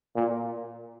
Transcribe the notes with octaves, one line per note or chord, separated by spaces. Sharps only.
A#2